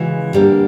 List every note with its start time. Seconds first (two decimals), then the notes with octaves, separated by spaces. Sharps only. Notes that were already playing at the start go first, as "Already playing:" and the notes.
Already playing: C#3 E3 G#3 F#4
0.34 D3 G3 A#3 G4